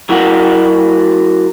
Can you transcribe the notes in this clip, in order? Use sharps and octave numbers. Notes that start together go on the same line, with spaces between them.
F#3 E4 F#4 A#4 F#5